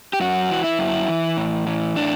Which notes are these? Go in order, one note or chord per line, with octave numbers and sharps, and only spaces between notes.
G4
F#2 F#4
E3
E4
F#2
E3
A2
E3
A2 D4